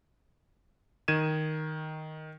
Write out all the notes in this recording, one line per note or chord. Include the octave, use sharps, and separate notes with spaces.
D#3 G#6 D#7 E7